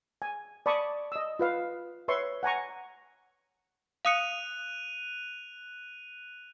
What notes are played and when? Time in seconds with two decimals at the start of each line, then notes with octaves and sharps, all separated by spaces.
0.22 G#5
0.66 D5 A5 B5 C#6 D#6
1.12 D#5 E6
1.39 F4 B4 F5
2.08 B4 C#5 E5 C6 C#6
2.43 F#5 G#5 A#5 C#6
4.05 F5 D#6 F#6 C#7 D#7 F7